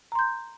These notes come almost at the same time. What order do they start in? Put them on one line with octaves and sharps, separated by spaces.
A#5 C6 G6